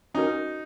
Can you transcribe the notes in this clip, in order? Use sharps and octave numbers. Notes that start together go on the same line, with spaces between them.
C#4 D#4 F#4 A#4